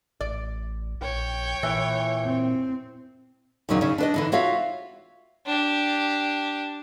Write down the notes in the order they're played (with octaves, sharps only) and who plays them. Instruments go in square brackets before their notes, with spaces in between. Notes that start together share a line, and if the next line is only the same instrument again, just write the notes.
[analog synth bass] A1 [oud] D5
[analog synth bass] A#1 [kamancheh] C#5 G5
[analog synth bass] A#2 [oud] E3
[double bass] C4
[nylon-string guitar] D#2 A#2 C#3 F#3 D#4
C#3 C#4 D#4
D4 B4 D#5
D3 E3 D#4
F4 F#4 C#5 E5 F5
[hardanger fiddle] D4 G4